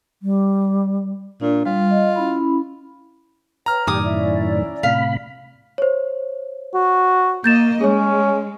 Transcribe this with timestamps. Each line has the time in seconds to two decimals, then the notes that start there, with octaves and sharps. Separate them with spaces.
0.22 G3
1.41 A#2 D4
1.65 G3 F4
1.91 D#5
2.16 C#4 E4 B5
3.66 B4 C#5 G5 A#5 F6
3.87 F#2 A2 D#3 G4 D5 G#5 D6 D#6
4.03 C#4 E4 D5
4.83 A2 C3 F5 B5
5.78 C5 C#5
6.74 F#4
7.44 A#3 D#5 G6 A6 E7
7.81 G#3 C#4 G#4 C#5